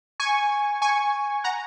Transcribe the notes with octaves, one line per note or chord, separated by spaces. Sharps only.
G#5 C#6
G#5 C#6
F#5 A#5